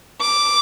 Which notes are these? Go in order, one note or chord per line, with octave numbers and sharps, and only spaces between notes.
D6